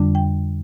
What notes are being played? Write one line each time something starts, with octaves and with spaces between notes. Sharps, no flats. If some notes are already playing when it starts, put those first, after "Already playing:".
Already playing: F2 D3 G3 D4
G5